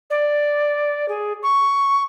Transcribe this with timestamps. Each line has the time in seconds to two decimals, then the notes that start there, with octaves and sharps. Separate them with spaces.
0.10 D5
1.08 G#4
1.42 C#6